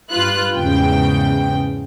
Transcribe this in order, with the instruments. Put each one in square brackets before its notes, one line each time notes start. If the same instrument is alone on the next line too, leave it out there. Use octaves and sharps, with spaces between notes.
[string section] G2 F4 B4 F#6
E2 G#2 C#3 G5